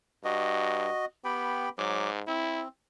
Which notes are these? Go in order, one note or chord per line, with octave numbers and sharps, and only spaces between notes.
G2 F#4 D#5
B3 G4 G5 B5
G#2 F#3 D6
C4 E4